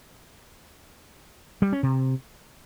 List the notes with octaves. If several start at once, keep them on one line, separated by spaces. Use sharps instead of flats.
G3
C#4
C3